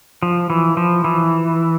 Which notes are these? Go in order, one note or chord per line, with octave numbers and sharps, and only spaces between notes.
F3
E3
F3
E3